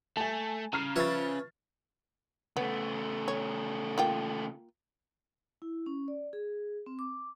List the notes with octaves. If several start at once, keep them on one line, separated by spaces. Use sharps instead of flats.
A3 G#5 A5
C#3 A#5 F6 C7
F3 B4 C#5 E5 A6
C#3 A3 B3
C#5
A#3 F4 G5
E4
C#4
D5
G#4
C4
D6